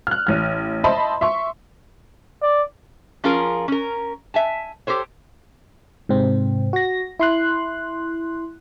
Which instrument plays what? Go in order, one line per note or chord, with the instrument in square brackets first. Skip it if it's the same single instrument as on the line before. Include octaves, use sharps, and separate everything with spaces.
[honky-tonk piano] F6 F#6
A1 F6
C5 D#5 E5 A5 B5 C6
E5 C6 C#6
[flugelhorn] D5
[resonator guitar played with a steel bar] F3 C#4 F4 G#4 A#4
C#4 A#4
E5 G#5 A5
G4 A4 C5 C#5
[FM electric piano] G#2 C3 C4
F#4 A#6
E4 C6 F#6